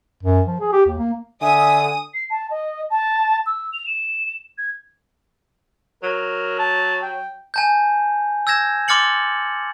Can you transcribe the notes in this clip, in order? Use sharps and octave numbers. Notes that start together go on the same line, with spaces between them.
F#2
F3
G#4
G4
D#2
A#3
D3 E5 G#5 D#6
C7
A5
D#5
A5
E6
F7
E7
G#6
F#3 A#4
A5
G5
G#5 A5 G6
E6 G6 G#6 A#6 E7
C6 D6 F6 A6 C#7 F#7